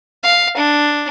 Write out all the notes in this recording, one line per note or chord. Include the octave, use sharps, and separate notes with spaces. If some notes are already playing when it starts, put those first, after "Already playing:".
F5
D4